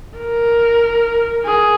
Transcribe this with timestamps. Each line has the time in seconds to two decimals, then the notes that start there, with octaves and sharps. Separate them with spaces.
0.18 A#4
1.45 G#4